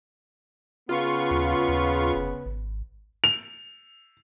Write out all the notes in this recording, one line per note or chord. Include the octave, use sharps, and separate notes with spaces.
C#3 B3 F4 C#6
D#2
D#2
F1
G#1
F7